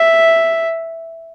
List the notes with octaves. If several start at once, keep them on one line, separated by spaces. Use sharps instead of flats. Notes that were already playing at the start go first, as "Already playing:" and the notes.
Already playing: E5